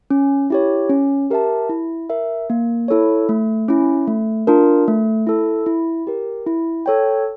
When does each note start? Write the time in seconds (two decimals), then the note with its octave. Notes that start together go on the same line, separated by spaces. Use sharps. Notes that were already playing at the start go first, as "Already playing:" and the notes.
0.10 C#4
0.50 E4 G4 C#5
0.90 C#4
1.31 G4 A#4 E5 A5
1.70 E4
2.10 A#4 E5
2.50 A#3
2.88 E4 A4 C#5
3.29 A3
3.68 C#4 E4
4.07 A3
4.47 D4 F4 A#4
4.88 A3
5.27 E4 A4
5.66 E4
6.07 G4 A#4
6.47 E4
6.86 A4 C#5 G5